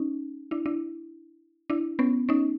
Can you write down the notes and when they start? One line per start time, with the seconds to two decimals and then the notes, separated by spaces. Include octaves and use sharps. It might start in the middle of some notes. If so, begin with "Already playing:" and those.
Already playing: C#4 D#4
0.51 D4 E4
0.66 D4 E4
1.70 D4 E4
1.99 B3 C#4
2.29 C#4 D#4